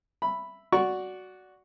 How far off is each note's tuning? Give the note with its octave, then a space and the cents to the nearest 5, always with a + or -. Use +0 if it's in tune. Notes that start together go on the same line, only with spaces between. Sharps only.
E5 +5 B5 +0
F#4 +0 D5 -15 C#6 +0